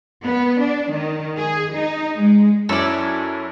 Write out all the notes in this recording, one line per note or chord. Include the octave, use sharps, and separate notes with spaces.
B3
D4
D#3
G#4
D#4
G#3
F#2 C#4 E4 A4 D5